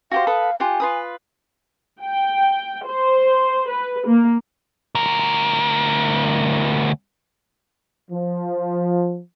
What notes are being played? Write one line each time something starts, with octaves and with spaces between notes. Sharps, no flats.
F#4 G4 C5 F5
A4 B4 D#6
F4 G4 F#5 G#5
F4 B4 D#6
G5
C5
B4
A#3
D2 A#4
F3